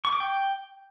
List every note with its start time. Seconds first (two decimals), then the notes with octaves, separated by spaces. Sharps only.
0.05 C#6
0.12 D6
0.20 G5